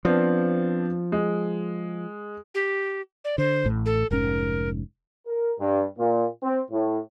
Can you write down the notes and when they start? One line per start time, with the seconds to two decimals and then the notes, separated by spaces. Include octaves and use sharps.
0.05 F3 B3 C4 D4
1.12 G#3
2.54 G4
3.24 D5
3.38 D3 C5
3.65 A1 A2
3.86 A4
4.11 F1 G#2 C#4 A#4
5.27 A#4
5.59 G2
5.98 A#2
6.43 C4
6.71 A2